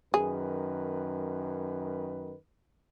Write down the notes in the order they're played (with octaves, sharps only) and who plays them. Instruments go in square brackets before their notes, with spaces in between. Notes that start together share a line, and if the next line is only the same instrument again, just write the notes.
[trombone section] F#2 D#3 B4 [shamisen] G#4